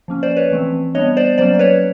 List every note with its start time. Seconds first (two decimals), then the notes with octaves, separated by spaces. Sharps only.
0.08 F3 A#3 C#4
0.23 C5 D5
0.36 B4 C#5
0.51 E3 A3 C4
0.95 G3 B3 D4 C#5 D#5
1.17 C5 D5
1.38 F#3 A#3 C#4 C5 D5
1.55 D5
1.59 B4 C#5